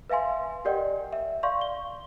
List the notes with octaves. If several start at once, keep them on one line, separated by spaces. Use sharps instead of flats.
B4 E5 F5 G#5 C6
G4 A#4 D5 D#5 F#5 G5
E5
D5 F5 C6 C#6
G7